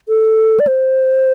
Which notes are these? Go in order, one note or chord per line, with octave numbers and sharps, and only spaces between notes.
A4
D5
C5